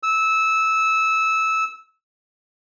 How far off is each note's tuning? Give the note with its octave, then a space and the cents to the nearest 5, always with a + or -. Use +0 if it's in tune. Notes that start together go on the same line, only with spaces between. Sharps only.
E6 -15